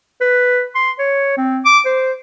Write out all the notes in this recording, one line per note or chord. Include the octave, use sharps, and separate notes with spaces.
B4
C6
C#5
C4
D6
C5